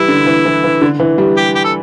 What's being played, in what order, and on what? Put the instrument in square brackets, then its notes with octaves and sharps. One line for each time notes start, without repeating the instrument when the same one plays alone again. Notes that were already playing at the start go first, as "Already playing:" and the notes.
Already playing: [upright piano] E3 G3 [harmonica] E4
[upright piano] D3
E3
E3
E3
D3
E3
G3
[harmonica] G4
G4
A4